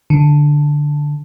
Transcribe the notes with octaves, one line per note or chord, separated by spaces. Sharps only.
D3